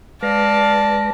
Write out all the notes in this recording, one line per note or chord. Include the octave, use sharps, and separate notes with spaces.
G#3 B4 D5 F5 A5 A#6